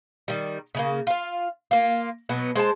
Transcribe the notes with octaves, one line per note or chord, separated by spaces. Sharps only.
D#3 G3
C#3 G#3 A#3
F4 F5
A#3 F4
B2 F#3 B3
G#3 C5 G#5 A5